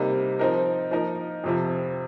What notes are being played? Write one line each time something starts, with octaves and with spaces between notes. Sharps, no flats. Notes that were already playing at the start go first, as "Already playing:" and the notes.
Already playing: C3 G3 A#3 D#4
F3 C4 D#4 A#4
F3 A#3 D#4 A#4
F2 C3 F3